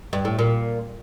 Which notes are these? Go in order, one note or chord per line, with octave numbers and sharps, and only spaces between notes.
G2
A2
A#2